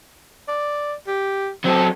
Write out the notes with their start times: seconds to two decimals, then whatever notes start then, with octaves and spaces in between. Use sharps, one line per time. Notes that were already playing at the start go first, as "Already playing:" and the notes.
0.48 D5
1.07 G4
1.65 F#3 C4 A4